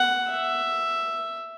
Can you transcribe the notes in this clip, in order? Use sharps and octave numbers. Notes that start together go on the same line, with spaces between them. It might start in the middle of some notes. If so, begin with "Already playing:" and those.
Already playing: F#5
E5